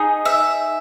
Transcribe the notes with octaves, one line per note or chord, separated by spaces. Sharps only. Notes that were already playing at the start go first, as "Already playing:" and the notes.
Already playing: D#4 G#4
E5